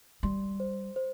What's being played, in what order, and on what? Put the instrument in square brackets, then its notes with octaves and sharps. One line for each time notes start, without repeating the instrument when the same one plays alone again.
[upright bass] G3 [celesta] C6
[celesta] C5
C5